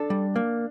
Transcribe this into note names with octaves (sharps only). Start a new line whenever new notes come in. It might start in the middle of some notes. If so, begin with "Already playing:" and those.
Already playing: D4 A4
G3
A#3